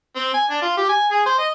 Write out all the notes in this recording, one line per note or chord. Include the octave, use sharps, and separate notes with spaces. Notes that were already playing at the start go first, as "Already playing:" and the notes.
C4
G#5
D4
F4
G4
G#5
G#4
C5
D#5